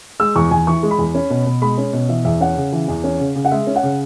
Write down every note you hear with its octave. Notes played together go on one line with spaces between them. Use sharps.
G#3 E6
E2 C#6
E2 G#5
E3 C#6
G#3
B5
E2
C#4
B2
B2
G#3 B5
C#4
B2
E3 E5
E2 E5
C#4 F#5
C#3
E3
E2
C#4
C#3
C#3
F#5
G#3 E5
C#4
F#5
C#3